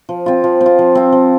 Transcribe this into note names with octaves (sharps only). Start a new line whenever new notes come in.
F3
C4 F4
F3
C4
F4
F3
C4 F4
F3